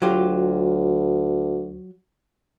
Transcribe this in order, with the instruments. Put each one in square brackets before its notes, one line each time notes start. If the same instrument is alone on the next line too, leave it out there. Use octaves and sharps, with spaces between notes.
[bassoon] D2 [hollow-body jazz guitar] F#3 F4 G4